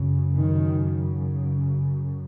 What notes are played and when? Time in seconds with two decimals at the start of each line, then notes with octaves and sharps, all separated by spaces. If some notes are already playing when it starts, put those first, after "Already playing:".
Already playing: F#2 C#3
0.36 D#3